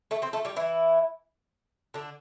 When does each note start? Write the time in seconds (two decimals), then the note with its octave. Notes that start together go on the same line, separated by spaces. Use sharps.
0.11 A3 A4
0.22 C4 C5
0.33 A3 A4
0.45 G3 G4
0.56 E3 E4
1.94 D3 D4